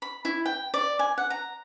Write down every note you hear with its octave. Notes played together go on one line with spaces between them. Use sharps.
B5
E4
G5
D5
G#5
F#5
A#5